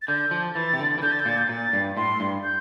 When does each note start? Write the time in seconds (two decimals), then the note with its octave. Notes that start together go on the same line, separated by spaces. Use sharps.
0.02 A6
0.08 D3 G6
0.31 F3
0.55 E3 A6
0.73 C3
0.79 D3
0.98 E3
1.02 D3 G6
1.12 A6
1.20 G6
1.25 A#2 A6
1.38 G6
1.49 A#2 A6
1.73 G2
1.97 A2 C6
2.20 G2
2.44 G6